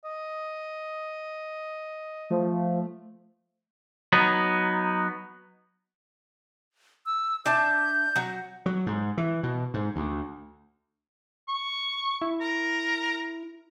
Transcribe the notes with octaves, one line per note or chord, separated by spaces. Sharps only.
D#5
F3 A3
F#3 B3 D#4
E6
D4 E5 A5 G6
F#3 F#4
F#3
G#2
E3
B2
G#2
D2
C#6
E4
A#4